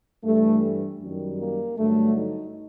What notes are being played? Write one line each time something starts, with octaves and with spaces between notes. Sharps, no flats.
G2 E3 G3 A3
F#2 D#3 G3
A#3
G2 D3 F#3 A3
D#4